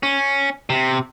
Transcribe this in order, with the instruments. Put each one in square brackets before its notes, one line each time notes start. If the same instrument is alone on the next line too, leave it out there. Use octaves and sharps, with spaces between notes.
[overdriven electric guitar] C#4
C3